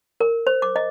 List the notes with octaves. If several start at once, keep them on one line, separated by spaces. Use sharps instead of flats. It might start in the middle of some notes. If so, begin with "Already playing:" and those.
A#4
C5
D6
D#5